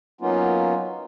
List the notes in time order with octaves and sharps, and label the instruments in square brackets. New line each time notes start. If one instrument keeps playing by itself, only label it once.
[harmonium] F#3 A#3 B3 C#4 D#4 F4